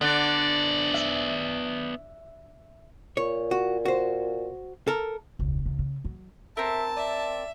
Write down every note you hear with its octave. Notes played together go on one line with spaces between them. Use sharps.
D3 B3 D4 D5
E5
A#2 C#5
F#4
F#4 C5
A4 A#4
E1 C#2
C#2
C#3
F#3
C4 A#4 E5 A5
D5 E5